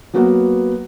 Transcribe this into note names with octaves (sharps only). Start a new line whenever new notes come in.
F#3 A#3 B3 F#4 B4 F#5